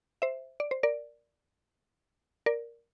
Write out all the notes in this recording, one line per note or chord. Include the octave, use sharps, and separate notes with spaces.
C5 E5
D5
C5
A#4 D5
A#4 D5